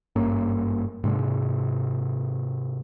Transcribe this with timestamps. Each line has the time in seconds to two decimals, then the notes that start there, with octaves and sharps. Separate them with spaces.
0.16 G#1 G2 A#3 C#4
1.04 G#2 C3 G#3 D4